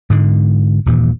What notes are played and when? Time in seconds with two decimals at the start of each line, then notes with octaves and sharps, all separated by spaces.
0.10 G#2 D3 G#3
0.86 D#1 G2 A#2 E3